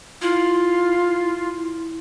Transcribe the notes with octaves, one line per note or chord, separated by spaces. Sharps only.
E4 F4